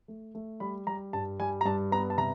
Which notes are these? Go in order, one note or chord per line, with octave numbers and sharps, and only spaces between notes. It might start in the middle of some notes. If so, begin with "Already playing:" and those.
A3
A3
G3 B5
G3 A#5
G2 A5
G3 G#5
A#5
G2 A5
B3 A#5
A5
C3 A#5